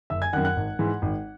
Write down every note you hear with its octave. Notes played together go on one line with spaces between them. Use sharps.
F#1 E5 E6
G#5 G#6
F#2 D#3 F#5 F#6
F#5 F#6
G#1
G#2 E3
G#1